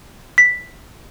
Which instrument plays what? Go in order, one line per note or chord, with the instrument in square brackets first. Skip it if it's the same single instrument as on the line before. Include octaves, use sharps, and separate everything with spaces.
[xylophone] B6